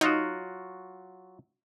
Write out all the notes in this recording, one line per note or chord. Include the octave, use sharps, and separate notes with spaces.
F#3 D#4 F4 F#4